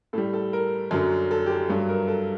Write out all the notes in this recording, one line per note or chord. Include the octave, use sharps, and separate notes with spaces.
A2 G3 A4
A4
A#4
F#2 D3 F#3
A4
G4
A4
G2 F#3 A4
A#4
A4